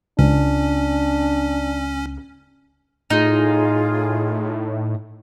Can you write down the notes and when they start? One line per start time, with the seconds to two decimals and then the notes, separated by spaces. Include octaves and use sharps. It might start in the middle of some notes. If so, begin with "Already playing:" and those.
0.19 C#2 C#4 D4
3.10 A2 D#4 F4 G#4